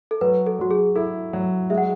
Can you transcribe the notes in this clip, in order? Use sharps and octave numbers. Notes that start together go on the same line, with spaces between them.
A4
F#3 B4
A4
F#3 F#4
G#4
E4 A4
F#3
G#3 E5
F#5